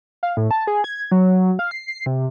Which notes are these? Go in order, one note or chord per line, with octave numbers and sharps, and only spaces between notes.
F5
A2
A5
G#4
G#6
F#3
F5
C7
C7
C3